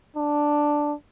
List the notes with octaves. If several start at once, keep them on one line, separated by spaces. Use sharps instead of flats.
D4